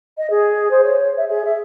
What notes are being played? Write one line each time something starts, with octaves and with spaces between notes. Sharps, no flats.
D#5
G#4
C5
C#5
E5
G#4
E5